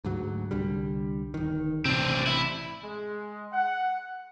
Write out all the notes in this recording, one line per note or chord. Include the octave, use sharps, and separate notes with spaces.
D2 G#2 F#3
C2 D3 G3
D1 D#3
A1 C3 C4 D4
E4
G#3
F#5